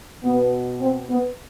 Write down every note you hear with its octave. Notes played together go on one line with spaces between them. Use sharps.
B2 B3
C4
B3